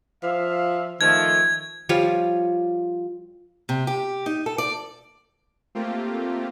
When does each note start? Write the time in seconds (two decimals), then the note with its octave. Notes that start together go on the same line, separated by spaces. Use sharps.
0.23 F3 E5 F5
1.01 D#3 F3 A3 G#6
1.89 F3 G3 F4 C#5
3.69 C3
3.87 G4
4.26 D#4
4.46 A4
4.58 D5
5.75 A3 A#3 C4 F4 G4